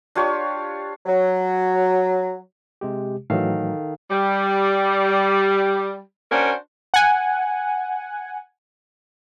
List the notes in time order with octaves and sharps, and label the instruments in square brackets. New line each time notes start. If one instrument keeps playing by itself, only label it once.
[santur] D4 F4 G4 C#5
[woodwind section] F#3
[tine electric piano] C3 G#3 G4
[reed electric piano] A2 E3 F#3 [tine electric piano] D#3 A4 F5
[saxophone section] G3
C#4 D4 F#4 A#4 C5
[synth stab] F#5 G#5